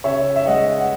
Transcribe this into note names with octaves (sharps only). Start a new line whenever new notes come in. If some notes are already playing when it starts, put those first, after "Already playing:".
C#3 C#5 E5
E5
G#3 D#5 F#5
F#5